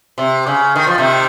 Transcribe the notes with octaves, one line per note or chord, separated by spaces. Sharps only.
C3
C#3
D#3
F3
C3 D#3